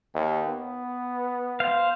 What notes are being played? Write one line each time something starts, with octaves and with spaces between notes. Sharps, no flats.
D#2
B3
C5 F5